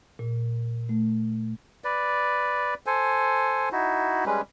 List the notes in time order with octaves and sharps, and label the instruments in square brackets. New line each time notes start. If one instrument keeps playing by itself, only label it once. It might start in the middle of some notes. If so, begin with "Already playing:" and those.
[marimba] A#2
A3
[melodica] B4 D5
A4 C5 G#5
D#4 E4 F#4
G3 G#3 C#4 B4